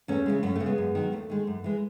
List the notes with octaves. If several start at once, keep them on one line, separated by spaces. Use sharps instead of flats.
E2 A3 C#4
C#3 E3 G#3
F#2 A3 C#4
C#3 G#3 A3
G#3 B3
F#2
D#3 F#3
D#2 A3
D#3 G#3
F#2
E3 G#3